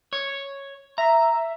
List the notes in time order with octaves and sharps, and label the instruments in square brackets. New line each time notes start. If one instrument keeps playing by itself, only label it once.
[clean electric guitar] C#5
[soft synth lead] E5 [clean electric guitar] A#5